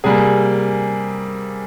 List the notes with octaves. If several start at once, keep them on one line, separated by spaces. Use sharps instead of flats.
C3 G3 A#3 G#4 G#5